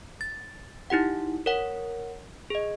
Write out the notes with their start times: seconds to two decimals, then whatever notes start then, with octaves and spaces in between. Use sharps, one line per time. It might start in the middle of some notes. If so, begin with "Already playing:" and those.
0.21 A6
0.90 D#4 E4 G4 F#5
1.46 A#4 C#5 F#5
2.50 G#4 D#5